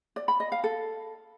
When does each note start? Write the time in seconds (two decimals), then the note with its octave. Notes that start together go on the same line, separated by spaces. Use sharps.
0.16 D5
0.28 B5
0.40 D#5
0.52 F5
0.64 A4